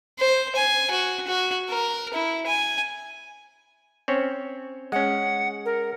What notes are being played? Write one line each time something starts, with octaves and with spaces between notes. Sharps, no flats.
C5
G#5
F#4
F#4
A#4
E4
G#5
C4 C#4 C#5
G#3 C#4 F#5
A#4